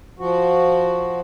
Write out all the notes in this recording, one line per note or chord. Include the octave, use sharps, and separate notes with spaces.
F3 F#4